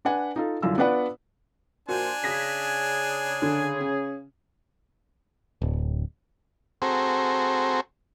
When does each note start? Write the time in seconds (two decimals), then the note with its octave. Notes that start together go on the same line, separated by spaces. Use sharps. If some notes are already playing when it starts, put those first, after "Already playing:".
0.05 D4 B4 F#5 G#5
0.36 D#4 F4 A4
0.62 C2 F#2 D3 F4 E6
0.78 B3 D4 F4 B4 D5 F#5
1.89 A#2 D4 F#4 C5 G#5
2.24 C#3 G#4 A#6 B6
3.42 D3
3.80 C#4
5.62 D1
6.82 C4 F#4 G#4 A4 C5 A#5